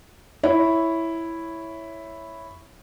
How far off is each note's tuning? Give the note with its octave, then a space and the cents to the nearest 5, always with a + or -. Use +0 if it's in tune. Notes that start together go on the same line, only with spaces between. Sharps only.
E4 +0 C#5 +0